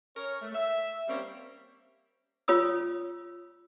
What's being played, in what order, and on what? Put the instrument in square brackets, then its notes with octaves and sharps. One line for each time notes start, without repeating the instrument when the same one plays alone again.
[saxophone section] C#4 A#4 C#5
A3
E5
G3 A#3 C4 C#4 G4
[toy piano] F4 C#5 B5 D#6 E6